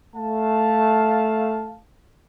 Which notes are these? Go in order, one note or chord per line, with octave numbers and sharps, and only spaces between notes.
A3 F5 A5